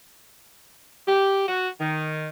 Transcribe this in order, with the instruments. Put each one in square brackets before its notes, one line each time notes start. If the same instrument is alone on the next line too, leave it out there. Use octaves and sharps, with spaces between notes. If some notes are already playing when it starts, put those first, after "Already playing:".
[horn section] G4
F#4
D#3